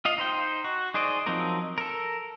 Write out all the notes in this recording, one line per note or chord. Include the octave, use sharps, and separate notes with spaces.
F4 D#5 F5
D#4 C5 G5
F#4
D#4 G#4 C5 D5 D#5
F3 F#3 C4 D#4 A#4
A4 A#4